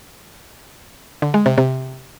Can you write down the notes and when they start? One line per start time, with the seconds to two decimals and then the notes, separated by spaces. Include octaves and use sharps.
1.22 D3
1.34 G#3
1.46 C3
1.58 C3